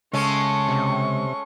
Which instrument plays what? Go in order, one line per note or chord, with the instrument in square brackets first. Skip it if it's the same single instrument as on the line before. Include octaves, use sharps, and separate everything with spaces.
[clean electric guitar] C#2 [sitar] G#3 A3 C#4 [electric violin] C#6
[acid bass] C3